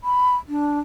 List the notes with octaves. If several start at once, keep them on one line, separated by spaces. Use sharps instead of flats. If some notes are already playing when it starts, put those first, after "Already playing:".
B5
D4